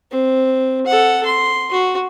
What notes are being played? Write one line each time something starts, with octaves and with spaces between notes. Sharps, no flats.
C4
A4 F#5
C6
F#4